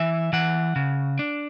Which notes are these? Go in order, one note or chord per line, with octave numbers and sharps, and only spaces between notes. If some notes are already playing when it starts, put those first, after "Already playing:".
Already playing: E3 E5
E3 F#5
C#3
D4